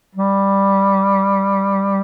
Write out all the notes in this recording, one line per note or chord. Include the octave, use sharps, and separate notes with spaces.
G3